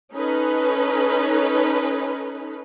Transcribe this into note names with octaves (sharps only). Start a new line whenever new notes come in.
C#4 D#4 A4 B4